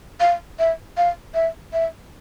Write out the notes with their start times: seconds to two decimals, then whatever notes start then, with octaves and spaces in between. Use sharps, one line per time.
0.20 F5
0.59 E5
0.97 F5
1.35 E5
1.73 E5